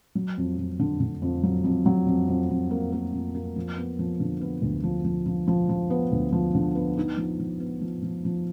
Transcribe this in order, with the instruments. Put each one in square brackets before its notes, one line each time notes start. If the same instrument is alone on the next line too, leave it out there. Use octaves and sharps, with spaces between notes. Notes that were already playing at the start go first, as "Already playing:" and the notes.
[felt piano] F#3
F2
F2
D3
D3
F2
F#3
F2
F#3
F2
F2
F2
A#3
A#3
F2
A#3
F3
B3
F3
D3
B3
D2
F3
F3
F3
F3
F3
B3
D2
F3
D3
B3
D#4
F3
F3
B3
F3
F3
F3